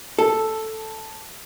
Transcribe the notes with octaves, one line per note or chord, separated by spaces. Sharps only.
A4